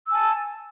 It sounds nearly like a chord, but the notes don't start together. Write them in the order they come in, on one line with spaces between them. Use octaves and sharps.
E6 G#5 A5